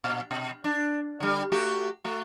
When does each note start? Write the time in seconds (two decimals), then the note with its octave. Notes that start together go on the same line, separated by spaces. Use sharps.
0.04 A#2
0.31 B2
0.64 D4
1.20 D3 G3
1.52 A3 F#4 G4
2.04 A3 F#4